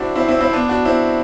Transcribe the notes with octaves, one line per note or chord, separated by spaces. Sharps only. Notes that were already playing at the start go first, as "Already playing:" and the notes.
Already playing: C4 D4 E4 F#4
C4 E4
C4 E4
C4 E4
B3 D4
D4 F#4
C4 E4